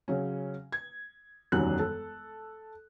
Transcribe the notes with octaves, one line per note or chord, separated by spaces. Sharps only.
C#3 F#3 C#4
G#6
E1 F#2 D#3 G3 F#4 F#6
A4